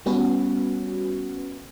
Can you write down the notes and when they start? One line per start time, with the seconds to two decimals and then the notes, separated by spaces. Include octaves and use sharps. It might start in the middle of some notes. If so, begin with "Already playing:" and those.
0.06 G3 B3 C#4 F#4 B4